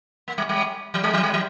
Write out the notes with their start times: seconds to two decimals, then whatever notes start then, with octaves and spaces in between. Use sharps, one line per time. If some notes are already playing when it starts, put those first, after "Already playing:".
0.28 A#3
0.38 G3
0.49 G3
0.94 F3
1.04 G3
1.13 F3
1.23 G3
1.33 F3